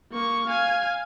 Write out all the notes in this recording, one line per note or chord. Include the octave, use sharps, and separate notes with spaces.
A#3 C#6
F5 G#5